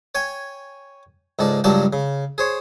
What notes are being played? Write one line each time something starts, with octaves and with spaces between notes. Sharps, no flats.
C#5 G5 G#5
C#2 G#2 A4 D5
C#2 G2 F#3 D5 G5 A5
C#3
G#4 C5 C#5